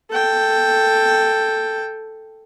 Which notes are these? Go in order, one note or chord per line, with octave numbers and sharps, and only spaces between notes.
A4 G5